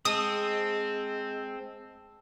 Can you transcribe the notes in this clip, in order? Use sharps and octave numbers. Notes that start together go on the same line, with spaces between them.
G#3 C4 A5 D#6 E6 E7